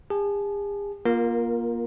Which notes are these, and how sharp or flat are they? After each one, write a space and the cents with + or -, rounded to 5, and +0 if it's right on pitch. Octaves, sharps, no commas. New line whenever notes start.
G#4 -45 A5 -40
A#3 +25 F4 +0 A#4 +0